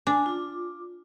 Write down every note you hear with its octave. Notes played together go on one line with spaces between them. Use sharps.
D4 G#5
F4 D6